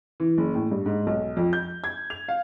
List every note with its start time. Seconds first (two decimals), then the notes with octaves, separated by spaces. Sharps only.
0.20 E3
0.38 F#1
0.55 A2
0.71 G2
0.86 G#2
1.07 B1
1.37 F2
1.53 G6
1.84 G#6
2.10 F7
2.28 F5